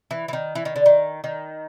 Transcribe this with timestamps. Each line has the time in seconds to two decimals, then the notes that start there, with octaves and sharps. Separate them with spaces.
0.11 E3
0.28 E3
0.33 D#3
0.55 E3
0.65 D#3
0.76 D3
0.86 D#3
1.24 D#3